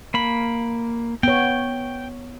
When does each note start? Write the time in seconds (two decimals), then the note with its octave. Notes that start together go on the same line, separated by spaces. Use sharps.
0.14 A#3 B5
1.23 B3 C#5 G5